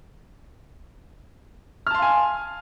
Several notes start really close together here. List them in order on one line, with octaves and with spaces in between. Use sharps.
F6 A5 C6 F5 G#5